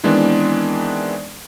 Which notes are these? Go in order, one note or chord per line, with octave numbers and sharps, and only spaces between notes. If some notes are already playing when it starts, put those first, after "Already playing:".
D#3 E3 G#3 B3 C4 D4